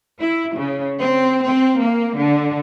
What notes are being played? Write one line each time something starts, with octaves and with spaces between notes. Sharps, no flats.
E4
C#3
C4
C4
A#3
D3